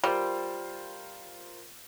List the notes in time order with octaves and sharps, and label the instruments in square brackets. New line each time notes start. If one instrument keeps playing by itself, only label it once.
[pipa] G3 [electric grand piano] F4 A#4 C5